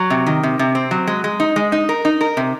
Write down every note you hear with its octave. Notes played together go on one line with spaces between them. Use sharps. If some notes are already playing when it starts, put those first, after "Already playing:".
Already playing: F#3
C3
D#3
C3
C3
C4
F#3
G#3
G#3
D#4
G#3
D#4
A#4
D#4
A#4
C3